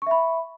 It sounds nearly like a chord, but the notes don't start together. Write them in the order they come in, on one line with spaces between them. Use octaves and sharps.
C#6 E5 B5